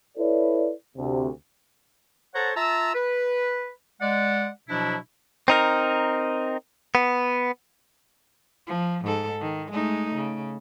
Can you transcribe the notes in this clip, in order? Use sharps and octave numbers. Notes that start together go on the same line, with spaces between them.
E4 A4 B4 C#5 D5
D2 C3
A4 C5 C#5 F#5 A5 A#5
F4 E5 A5 A#5 E6
B4
G#3 D5 F#5
B2 F3 F#3 D4 E4
C4 D#4 A#4
B3
F3
G#2 A4
D#3
G#3 A3 D#4
C#3